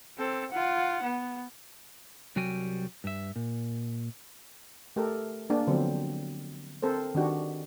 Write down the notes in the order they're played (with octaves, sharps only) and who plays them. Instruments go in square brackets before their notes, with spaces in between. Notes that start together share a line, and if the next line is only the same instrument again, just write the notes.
[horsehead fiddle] C4 A4
F4 F#5
B3
[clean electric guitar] C2 F#3 G3 F#4 G5 G#5
G2 E5
A#2
[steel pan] A3 G4 A4 A#4
A#3 D4 G#4
D3 F3 F#3 B3 C4
C4 A4 A#4 C5
D#3 D4 F#4 G4